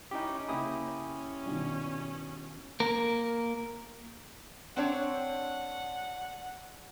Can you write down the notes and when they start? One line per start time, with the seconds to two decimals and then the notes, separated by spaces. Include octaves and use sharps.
0.11 C#4 D#4 E4 G4
0.48 C#3 A#3 E4 G4 G#5 D#6
0.89 C#4
1.46 G2 B2 D#3
2.80 A#3 A#4
4.77 C4 D4 C#5 F#5